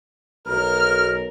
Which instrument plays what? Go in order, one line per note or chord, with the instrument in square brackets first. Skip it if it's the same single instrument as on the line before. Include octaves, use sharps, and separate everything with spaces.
[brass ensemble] B1 A#4 [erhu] F6